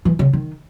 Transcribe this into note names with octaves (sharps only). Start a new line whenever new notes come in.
E3
C#3
D#3